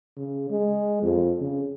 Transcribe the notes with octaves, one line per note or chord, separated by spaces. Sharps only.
C#3
G#3
F2
C#3